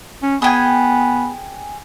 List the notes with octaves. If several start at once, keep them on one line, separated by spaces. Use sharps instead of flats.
C#4
B3 G#4 G5 G#5